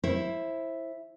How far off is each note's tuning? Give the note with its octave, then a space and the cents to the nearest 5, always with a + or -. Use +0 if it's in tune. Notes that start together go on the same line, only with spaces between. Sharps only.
E4 +0 C5 +25